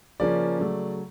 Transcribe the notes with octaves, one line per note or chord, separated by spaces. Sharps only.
C#3 F3 A#3 C#4 D5
C#3 F#3 A3